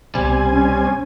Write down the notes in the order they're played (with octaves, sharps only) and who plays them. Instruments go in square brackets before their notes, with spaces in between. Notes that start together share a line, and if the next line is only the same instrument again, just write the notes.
[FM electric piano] C2 B2 [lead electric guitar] G3 [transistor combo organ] C4 G#5
[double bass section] C#4